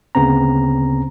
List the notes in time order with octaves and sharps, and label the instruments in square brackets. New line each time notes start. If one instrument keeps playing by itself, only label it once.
[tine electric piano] D2 C#3 B3 C4 A#5